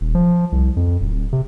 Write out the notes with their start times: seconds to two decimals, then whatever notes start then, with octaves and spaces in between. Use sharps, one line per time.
0.01 D#1
0.15 F3
0.52 C2
0.77 F2
1.01 D1
1.33 C3